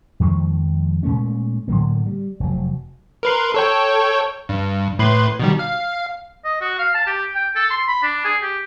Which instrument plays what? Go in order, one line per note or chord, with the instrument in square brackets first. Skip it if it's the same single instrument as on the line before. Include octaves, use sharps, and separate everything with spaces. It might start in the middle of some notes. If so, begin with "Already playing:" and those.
[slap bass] F2 D#3 F3 G#3
A#2 G#3 A3 C#4
A2 D3 F#3 A#3
G3
F1 F#3
[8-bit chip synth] A#4 B4 C6
A4 C#5 G5
G2
A2 B4 C6
B2 D#3 G3
F5
[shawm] D#5
F#4
F5
A5
G4
G5
A4
C6
B5
D4
G#4
G4